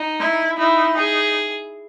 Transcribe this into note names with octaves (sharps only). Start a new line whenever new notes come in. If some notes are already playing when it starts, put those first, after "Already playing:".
Already playing: D#4
E4
D#4 E4
G#4